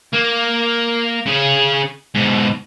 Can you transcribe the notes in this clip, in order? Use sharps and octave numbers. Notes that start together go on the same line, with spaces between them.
A#3
C#3 G#4
G#2 B2